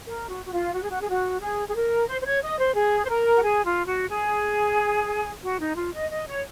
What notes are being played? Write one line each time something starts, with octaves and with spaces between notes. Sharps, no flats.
A#4
F#4
F#4
F4
F#4
G#4
F#4
G#4
F#4
G#4
G#4
A#4
C5
C5
C#5
D#5
C5
G#4
C5
A#4
F#4
G#4
F4
F#4
G#4
F#4
D#4
F4
D#5
D#5
C#5